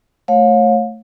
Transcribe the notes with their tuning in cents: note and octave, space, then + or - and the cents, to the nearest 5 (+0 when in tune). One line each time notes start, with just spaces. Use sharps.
A3 +0 C#5 -25 F5 +35